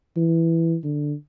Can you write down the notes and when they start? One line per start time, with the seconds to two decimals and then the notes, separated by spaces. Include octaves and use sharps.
0.17 E3
0.83 D3